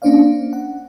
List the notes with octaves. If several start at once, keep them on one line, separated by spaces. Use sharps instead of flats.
A#3 C#4 D4 C5 D5 F5
F#5